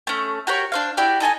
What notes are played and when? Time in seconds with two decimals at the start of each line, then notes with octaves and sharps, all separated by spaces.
0.07 A3 C#4
0.47 F#4 G4 A#4 C#5
0.72 D4 C5 F5
0.97 E4 F#4 G4 D5
1.20 D#4 A4 G#5 A#5